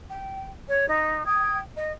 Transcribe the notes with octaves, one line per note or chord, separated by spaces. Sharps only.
G5
C#5
D#4
G5 D#6 G#6
D#5